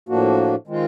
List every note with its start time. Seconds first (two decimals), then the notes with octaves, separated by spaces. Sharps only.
0.09 A2 F3 A#3 D4 F#4
0.67 D#3 G#3 C4 F4